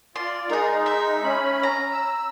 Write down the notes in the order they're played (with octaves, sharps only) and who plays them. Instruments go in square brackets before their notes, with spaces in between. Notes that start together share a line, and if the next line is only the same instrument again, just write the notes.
[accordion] F4 D5 [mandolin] C6
[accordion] G#3 D#4 [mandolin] G#4 A#4
[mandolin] E5
[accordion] C#4 B5
[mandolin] A#5
[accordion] E6